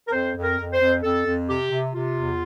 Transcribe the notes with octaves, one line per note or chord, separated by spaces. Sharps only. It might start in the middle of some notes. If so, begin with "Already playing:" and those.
A#4
F2 C5
F2
A#4
F2
C5
F2
F2 A4
F2
C3 G4
C3
C3 F4
E2